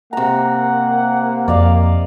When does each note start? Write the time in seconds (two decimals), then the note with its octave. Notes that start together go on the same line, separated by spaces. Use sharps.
0.13 C3 A#3 F#5 A#5
1.48 F2 D5 D#5 F5